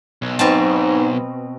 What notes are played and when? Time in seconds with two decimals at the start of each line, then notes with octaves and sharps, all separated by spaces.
0.22 B1
0.39 G#2 B2 C4 A5